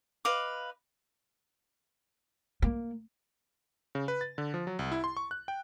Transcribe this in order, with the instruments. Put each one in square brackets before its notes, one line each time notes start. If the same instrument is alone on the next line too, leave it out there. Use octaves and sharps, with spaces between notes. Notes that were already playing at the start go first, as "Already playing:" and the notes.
[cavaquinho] B4 D#5 F5 D6
[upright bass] A#3
[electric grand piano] C#3
B4
A6
D3
F3
F#3
C2
E4
C6
C#6
F#6
G5